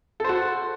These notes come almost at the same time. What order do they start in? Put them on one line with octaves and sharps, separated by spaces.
A4 C5 F#4